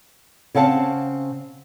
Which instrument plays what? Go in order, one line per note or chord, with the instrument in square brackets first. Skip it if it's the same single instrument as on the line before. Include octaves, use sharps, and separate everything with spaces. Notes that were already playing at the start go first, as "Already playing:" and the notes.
[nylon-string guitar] C#3 C4 F5 F#5 A5